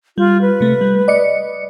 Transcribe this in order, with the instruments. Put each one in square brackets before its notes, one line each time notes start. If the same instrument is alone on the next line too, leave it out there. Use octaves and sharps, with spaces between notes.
[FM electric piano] G3 [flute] F4
[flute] B4
[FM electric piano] C3 A3
G3
D5 D#5 C#7